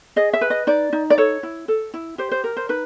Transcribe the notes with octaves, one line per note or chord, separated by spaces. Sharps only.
G#4 D#5
E5
B4
D#5
D#4 D5
D#4
D5
A4 C#5
E4
A4
E4
G4 C5
C5
A#4
C5
D#4 B4